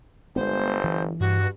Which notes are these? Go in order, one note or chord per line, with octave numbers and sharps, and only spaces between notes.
G1 G#3 A#3 B3 C5
E3
G2 F#4